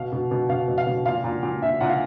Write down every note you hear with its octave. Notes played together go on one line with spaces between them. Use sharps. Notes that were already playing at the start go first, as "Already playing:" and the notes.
Already playing: B2 F5
B2
B2
B2 F5
B2
F5
B2
A#2 F5
A#2
A#2
A#2 E5
A#2 F#5
F5